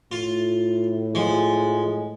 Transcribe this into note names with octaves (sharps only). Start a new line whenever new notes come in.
A2 F4
F3 G#3